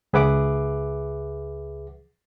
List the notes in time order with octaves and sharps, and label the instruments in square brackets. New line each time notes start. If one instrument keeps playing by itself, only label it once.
[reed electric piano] C#2 G#4 B4 E5 F#5 D6